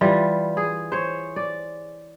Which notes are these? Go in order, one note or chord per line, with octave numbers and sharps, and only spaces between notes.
E3 G3 F4
G#4
C5 C#5
D5